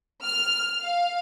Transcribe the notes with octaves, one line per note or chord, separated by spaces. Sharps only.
F6
F5